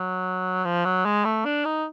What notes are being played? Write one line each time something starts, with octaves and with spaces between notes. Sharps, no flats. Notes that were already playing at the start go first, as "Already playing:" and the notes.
Already playing: F#3
F3
F#3
G#3
A3
D4
D#4